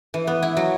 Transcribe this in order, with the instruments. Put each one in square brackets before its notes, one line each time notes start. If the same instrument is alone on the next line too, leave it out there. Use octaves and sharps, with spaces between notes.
[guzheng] E3
B3
E4
F#3